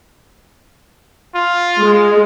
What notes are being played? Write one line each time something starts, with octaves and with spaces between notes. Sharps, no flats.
F4
G#3